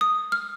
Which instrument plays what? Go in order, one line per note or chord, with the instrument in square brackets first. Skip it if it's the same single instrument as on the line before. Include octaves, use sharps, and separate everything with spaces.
[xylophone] D#6
F6